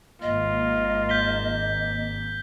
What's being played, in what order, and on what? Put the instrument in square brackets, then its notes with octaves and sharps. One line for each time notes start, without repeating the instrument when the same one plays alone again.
[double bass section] G#1 A#3 [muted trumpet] F4 [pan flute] D#5
[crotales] G6 B6 G7